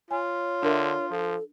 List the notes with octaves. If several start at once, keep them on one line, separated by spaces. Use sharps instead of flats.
F4 C#5 G#5
D3 D4 A#4 E5
F3 A4